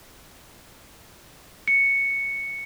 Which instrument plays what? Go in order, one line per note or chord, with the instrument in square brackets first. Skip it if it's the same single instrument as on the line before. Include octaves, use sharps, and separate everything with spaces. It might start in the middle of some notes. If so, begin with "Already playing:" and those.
[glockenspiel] C#7